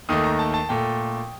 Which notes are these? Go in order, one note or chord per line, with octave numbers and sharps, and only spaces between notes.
D#2 D#3 A3 D#6
A#5
A5
A5
A#2 A3 G5